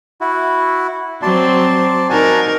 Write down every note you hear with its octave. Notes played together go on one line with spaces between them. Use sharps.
E4 F#4
F#3 C4 D5 A5 C6
D#4 F#4 A#4 G#5 A5